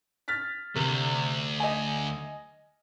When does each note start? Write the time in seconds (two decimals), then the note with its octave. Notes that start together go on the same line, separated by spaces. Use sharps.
0.28 F6 A6 B6
0.75 D2 C3
1.60 D#5 G#5